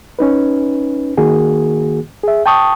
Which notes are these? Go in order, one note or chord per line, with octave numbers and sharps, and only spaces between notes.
C#4 D#4 B4
D#3 A#3 F#4 G#4
G#4 E5
G5 A5 C#6 D#6